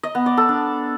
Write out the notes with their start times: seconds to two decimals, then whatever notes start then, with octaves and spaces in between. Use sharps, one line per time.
0.03 D#5
0.15 B3
0.26 D5
0.37 A4
0.49 D4